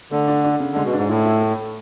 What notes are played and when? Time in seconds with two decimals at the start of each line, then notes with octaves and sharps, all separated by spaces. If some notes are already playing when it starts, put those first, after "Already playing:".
0.11 D3 A3
0.28 D4
0.44 D4
0.60 C#3
0.72 D3 G#3
0.85 B2
0.93 G#2 D4
1.09 A2 E4
1.26 E4
1.42 A3